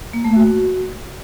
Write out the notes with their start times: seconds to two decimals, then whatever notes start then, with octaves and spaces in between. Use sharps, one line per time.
0.13 A#3
0.24 A3
0.35 F#4